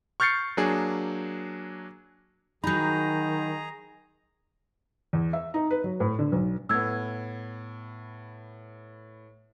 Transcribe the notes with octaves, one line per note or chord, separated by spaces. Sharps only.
C#6 F6 G6 A6 C7 C#7
F#3 A#3 D4 G#4
D#3 F#3 D#4 G#4 A#5 B5 G6
E2
E5
D#4
B4
F#3
A2
D3
B1
A2 B3 E6 G#6